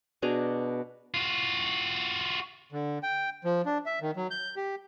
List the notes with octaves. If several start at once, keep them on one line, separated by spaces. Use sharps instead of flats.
B2 D4 G#4 A#5
F4 F#4
D3
G5
F3
D4
E5
D#3
F#3
G6
G4